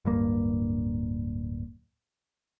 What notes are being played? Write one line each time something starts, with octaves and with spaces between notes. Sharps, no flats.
D1 G2 A#3